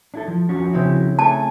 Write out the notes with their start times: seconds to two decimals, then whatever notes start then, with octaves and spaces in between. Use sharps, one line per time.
0.14 D4 E4 A4
0.28 F3
0.49 F3 C#4 F#4
0.73 C#3 C4 E4
1.19 A3 G#5 A5